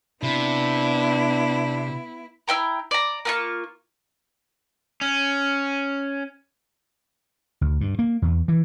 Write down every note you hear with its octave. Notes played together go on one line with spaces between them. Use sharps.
C3 B3 D4 E4
E4 D#5 G5 A#5
D5 A#5
A#3 F4 C#6
C#4
D2
G2
A#3
E2
E3